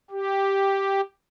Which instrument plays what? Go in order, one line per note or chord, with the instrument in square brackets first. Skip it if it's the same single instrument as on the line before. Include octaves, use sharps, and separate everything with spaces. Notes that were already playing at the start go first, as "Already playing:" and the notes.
[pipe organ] G4